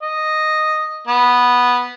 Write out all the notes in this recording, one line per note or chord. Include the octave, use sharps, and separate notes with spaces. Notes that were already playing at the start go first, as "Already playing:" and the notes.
D#5
B3